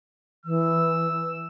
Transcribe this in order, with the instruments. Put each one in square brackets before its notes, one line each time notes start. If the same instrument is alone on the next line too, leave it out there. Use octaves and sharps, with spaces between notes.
[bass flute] E3 [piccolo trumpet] E6